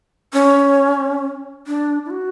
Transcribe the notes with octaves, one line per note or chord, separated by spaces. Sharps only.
C#4
D4
E4
F#4